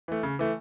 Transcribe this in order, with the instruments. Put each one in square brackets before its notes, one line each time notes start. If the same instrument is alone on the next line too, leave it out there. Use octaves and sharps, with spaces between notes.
[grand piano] E3 A3
C#3
E3 A3